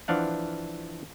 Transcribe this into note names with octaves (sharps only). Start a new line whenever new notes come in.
E3 F3 D4 F5 F#5